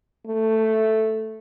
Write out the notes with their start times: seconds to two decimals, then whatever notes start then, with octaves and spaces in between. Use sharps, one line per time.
0.27 A3